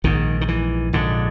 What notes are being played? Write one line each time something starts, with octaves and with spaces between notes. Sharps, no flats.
A#1 G#2 D#3
D#3
E3
A#1 G#2 D3